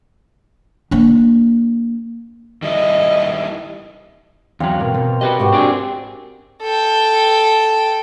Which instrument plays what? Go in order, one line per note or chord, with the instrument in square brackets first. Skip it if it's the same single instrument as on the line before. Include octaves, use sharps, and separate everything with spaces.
[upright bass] A#3 D4
[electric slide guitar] D#3 G3 E4 [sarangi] D#5
[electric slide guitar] E2 F#3 [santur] C4 F5
[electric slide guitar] G2 B2 [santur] A#4
[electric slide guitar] B2 [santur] C5
[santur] G3 [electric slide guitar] F#4 B4 D#5
[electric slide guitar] G#2 [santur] F#4 G4
[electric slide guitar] C4 D4 G#4
[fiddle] A4 G5